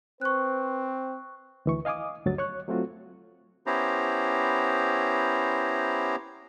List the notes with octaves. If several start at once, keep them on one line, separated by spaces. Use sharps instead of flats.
C4 B4 C5 C#6 F#6
D2 E3 C#6
D#5 F5 G#5 D6 D#6
D2 G2 F#3 A6
C#5 C#6 F#6
F#3 A3 C4 F4 F#4
B3 C#4 E4 G4 C5 A#5